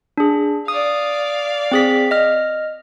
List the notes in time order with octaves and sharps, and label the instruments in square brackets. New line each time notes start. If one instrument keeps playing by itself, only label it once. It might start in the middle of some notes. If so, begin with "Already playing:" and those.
[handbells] D4 G#4
[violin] D5 F5 [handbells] D#6
[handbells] C4 G#4 B6
D#5 F6